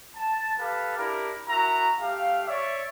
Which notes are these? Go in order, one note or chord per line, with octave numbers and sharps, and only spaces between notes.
A5
G4 A4 B4 F5
D4 E4 G4 A#4
E4 F#4 A#4 A#5
A3 G4 F5
C#5 D5 E5